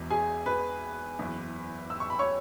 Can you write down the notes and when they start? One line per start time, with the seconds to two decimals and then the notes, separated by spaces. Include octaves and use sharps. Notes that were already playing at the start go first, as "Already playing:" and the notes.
Already playing: E1 E2 E3
0.10 G#4 G#5
0.46 B4 B5
1.18 F#1 E2 E3
1.90 E6
2.00 C#6
2.10 B5
2.19 C#5 C#6